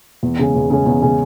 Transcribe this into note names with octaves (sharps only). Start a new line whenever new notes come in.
E2
C#3 G#3 C#4
E2
C#3 G#3 C#4
E2
C#3 G#3 C#4